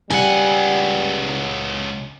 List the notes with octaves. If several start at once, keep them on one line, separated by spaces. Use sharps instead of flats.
C#2 G3 F#5 G#5